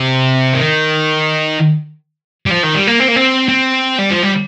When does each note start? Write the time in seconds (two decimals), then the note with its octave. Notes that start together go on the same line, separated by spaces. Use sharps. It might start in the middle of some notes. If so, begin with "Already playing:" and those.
Already playing: C3
0.54 D#3
2.46 G3
2.50 F3
2.63 D#3
2.75 G3
2.87 A#3
3.00 C4
3.08 A#3
3.16 C4
3.49 C4
3.99 G3
4.11 F3
4.22 G3